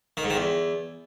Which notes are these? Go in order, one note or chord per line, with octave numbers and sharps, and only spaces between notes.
D#3
G#2
D#3
E2